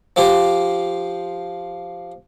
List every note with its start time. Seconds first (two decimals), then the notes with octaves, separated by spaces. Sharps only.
0.16 F3 G4 C5